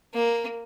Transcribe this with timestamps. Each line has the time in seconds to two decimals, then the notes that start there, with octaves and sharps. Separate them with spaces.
0.14 A#3